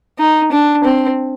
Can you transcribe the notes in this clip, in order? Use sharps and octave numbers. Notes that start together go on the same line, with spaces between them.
D#4
D4
C4